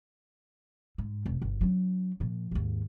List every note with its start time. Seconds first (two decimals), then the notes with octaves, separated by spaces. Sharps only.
0.98 G#2
1.26 F1
1.42 G1
1.61 F#3 D4
2.20 A#2 F3
2.51 D#2 G#2